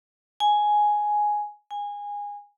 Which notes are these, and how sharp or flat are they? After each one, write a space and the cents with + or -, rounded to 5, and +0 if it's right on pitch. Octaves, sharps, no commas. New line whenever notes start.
G#5 +5
G#5 -20